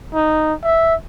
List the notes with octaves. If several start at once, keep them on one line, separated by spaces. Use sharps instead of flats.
D#4
E5